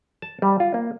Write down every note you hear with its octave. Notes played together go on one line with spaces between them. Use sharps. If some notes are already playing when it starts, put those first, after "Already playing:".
A5
G3
F4
A#3